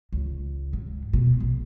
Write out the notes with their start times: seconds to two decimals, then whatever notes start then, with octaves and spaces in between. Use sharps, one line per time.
0.13 C#2
0.73 G#2
1.13 B2
1.40 A#1